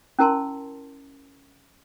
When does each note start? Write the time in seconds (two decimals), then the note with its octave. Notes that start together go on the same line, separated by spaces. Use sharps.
0.19 C#4 E4 A#4 A5 C6